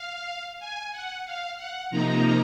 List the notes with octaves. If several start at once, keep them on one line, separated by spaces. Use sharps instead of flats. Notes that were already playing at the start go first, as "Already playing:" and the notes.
Already playing: F5
G#5
F#5
F5
F#5
C3 F3 A#3 D#4 A#5